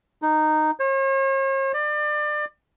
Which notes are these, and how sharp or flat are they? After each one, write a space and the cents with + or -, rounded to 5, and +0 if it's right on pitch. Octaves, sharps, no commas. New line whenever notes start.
D#4 -10
C#5 -45
D5 +30